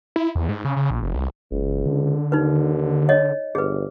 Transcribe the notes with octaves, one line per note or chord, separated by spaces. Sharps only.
E4
E2
G#2
C#3
C#3
A#1
F1
C2
F#1 C#2
D3
D#2 D#4 B4
C#5 D#5
G1 G#4 B4